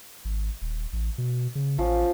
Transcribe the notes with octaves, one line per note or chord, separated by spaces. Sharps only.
G#1
D#1
A1
B2
C#3
A1 F3 C#4